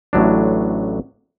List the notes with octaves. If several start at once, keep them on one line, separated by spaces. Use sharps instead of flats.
A1 A2 F#3 D4